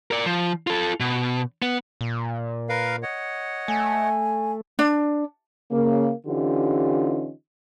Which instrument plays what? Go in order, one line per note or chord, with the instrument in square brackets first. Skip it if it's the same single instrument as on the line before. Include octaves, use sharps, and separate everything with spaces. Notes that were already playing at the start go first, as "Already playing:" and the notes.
[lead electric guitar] A#4 D5
F3
F4 A4
B2
B3
[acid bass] A#2
[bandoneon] A#4 B4 F5
C#5 D#5 F#5
[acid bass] A3 [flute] G#5
[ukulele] D4
[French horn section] C#3 A#3
D3 E3 C#4 D#4 F4 G4